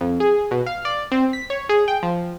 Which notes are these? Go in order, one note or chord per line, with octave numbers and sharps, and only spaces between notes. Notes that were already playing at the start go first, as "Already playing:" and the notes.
F2
G#4
B2
F5
D5
C4
B6
C#5
G#4
G5
F3